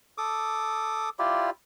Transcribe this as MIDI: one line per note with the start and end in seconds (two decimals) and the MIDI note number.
0.18 1.09 69
0.18 1.09 86
0.18 1.09 87
1.19 1.50 64
1.19 1.50 65
1.19 1.50 67
1.19 1.50 74